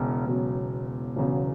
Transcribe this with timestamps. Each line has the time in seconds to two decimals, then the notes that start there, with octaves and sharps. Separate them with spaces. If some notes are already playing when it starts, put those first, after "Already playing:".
Already playing: E1 E2 C#3
0.25 E1 E2 C#3 F#3
1.16 E1 E2 C#3 F#3